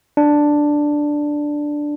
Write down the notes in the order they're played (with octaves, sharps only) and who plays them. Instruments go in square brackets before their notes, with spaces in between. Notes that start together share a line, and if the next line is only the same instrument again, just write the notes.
[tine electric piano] D4